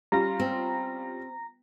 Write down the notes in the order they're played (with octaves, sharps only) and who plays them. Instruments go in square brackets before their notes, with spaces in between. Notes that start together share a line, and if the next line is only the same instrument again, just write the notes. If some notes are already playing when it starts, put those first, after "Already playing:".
[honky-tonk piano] G3 C#4 F4 [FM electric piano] A#5 A#6
[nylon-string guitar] C4